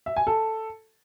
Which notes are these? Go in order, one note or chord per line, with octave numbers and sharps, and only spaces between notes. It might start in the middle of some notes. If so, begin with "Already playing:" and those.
E5
G#5
A4